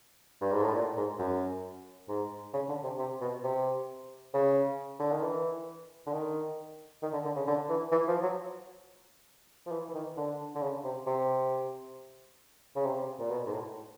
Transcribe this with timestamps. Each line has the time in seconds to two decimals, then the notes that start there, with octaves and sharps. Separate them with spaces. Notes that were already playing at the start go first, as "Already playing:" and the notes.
0.42 G2
0.52 G#2
0.63 A2
0.74 A#2
0.97 G#2
1.19 F#2
2.09 G#2
2.54 C#3
2.69 D3
2.84 C3
2.99 C3
3.21 B2
3.44 C3
4.34 C#3
5.00 D3
5.12 D#3
5.23 E3
6.07 D3
6.13 D#3
7.03 D#3
7.13 D3
7.25 D3
7.36 C#3
7.48 D3
7.69 E3
7.92 E3
8.08 F3
8.23 F#3
9.67 F3
9.72 E3
9.89 E3
9.95 D#3
10.17 D3
10.55 D3
10.62 C#3
10.84 C3
11.07 C3
12.76 C#3
12.86 C3
13.20 A#2
13.31 B2
13.46 G#2
13.53 A2